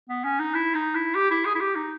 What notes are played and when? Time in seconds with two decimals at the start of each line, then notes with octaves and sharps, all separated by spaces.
0.09 B3
0.24 C#4
0.39 D#4
0.54 E4
0.75 D#4
0.95 E4
1.15 G4
1.31 E4
1.46 G#4
1.55 E4
1.61 G4
1.75 D#4